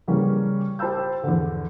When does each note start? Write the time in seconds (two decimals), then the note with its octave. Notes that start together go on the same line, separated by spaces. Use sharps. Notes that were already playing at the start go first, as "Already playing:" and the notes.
0.08 C#3 E3 G3 A#3 C#4
0.79 G4 C5 A5 B5 E6 G6
1.24 E2 D3